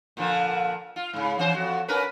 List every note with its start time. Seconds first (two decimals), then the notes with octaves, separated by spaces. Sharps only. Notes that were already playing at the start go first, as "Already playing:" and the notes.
0.17 A#2 D3 F3
0.96 F4
1.13 G#2 C#3
1.38 E3 C#4 C5
1.55 F2 F#4
1.88 C#4 A#4 B4